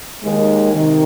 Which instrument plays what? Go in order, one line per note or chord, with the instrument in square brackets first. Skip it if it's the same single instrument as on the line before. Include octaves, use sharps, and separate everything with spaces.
[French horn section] D#2 D#3 G#3
C3 D#3